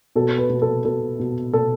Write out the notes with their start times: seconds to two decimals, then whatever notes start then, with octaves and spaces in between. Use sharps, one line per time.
0.16 B2 A4
0.38 B4
0.50 B2
0.62 A4
0.85 B2 A4
1.19 B2
1.53 B2 A4